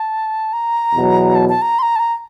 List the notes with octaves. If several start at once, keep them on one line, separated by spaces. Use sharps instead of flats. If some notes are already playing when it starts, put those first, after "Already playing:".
Already playing: A5
A#5
E2 B2 F#3
A5
A5
A#5
C6
A#5
A5
A#5